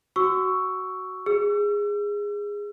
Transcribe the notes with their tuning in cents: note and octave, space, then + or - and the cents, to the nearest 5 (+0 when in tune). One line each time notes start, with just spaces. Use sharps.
F#4 +10 C#6 +5 E6 +0
G#4 -15 E6 +40